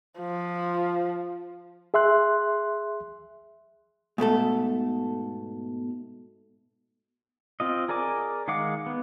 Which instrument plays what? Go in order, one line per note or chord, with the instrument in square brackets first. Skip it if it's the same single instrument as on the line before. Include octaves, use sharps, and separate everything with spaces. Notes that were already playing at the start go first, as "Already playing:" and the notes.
[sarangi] F3
[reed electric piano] G#4 E5 C6 F#6
[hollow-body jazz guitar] G#2 B2 A3 A4
[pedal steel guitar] C4 F4 D#5
G#4 A#4 D5 G#5 D6
D#3 G#3 F5 F#5 D6
B3